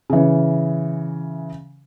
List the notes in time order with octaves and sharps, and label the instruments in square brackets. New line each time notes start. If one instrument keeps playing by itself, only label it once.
[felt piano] C#3 E3